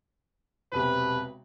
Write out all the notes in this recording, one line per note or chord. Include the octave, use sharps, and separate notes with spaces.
E1 B1 C3 B4